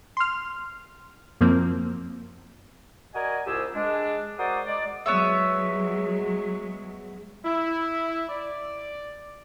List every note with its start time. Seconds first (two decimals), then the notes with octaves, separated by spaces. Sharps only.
0.17 C6 F6
1.41 F#2 F3 A#3 C4
3.14 F#4 A#4 D5 D#5 G#5
3.46 C2 G#2 F4 G4 G#4 E6
3.75 G#3 D4
4.39 F#4 A#4 C5 D5 D6 D#6
4.66 G#3 D5
5.06 F#3 G#3 B3 C#5 E5
7.44 E4
8.29 D5